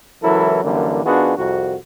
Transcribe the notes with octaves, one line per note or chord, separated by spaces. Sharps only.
C#2 E3 F#3 E4 A4 A#4
F#2 D3 E3 G3 A#3
D#3 B3 D4 F4 F#4 G#4
C2 F2 F#4